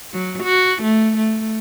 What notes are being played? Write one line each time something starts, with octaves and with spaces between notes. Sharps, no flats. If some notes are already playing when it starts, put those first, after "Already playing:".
F#3
F#4
A3
A3